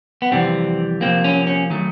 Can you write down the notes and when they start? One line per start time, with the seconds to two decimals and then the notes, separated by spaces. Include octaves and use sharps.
0.22 B3
0.31 F2 C3 E3 G3 C4
1.01 C3 F3 A#3 C4
1.24 C#4
1.47 C#4
1.70 D#3 F#3 A3